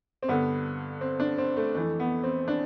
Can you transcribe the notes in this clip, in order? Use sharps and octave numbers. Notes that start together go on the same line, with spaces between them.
C4
G2 D3 B3
C4
D4
C4
A3
F2 E3 A3
B3
C4
D4